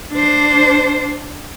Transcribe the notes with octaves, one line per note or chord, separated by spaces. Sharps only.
D4 C5